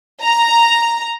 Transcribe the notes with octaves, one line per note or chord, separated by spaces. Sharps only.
A#5